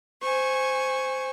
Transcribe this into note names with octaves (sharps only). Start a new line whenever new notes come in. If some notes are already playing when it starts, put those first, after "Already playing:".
C5 G#5 C#6